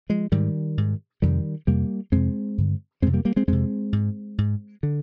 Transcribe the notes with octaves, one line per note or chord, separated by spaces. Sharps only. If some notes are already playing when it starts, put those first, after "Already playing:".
F3 G#3
G#2 D#3 G3
G#2
F2 C3 D#3 G3
F2 C3 G3 A#3
F2 C3 G#3 C4
G2 D3
F2 C3 G#3 C4
G3 A#3
G3 A#3
G#3 C4
F2 C3 G#3 C4
G#2
G#2
D3